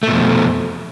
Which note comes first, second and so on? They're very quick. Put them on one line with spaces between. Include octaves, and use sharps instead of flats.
A3 B2 F2